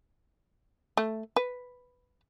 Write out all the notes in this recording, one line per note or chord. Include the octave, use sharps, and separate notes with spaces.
A3
B4